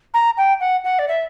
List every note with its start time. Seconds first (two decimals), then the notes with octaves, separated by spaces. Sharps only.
0.14 A#5
0.37 G5
0.60 F#5
0.84 F#5
0.99 D5
1.08 E5